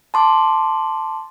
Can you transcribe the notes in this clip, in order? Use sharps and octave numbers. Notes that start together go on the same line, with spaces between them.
A5 C6 D6